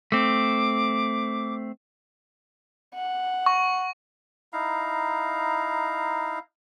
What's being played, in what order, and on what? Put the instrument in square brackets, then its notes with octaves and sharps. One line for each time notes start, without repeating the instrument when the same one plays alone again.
[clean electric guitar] A3 C4 [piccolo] D6
[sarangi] F#5
[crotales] C#6
[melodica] D#4 E4 F5 A#5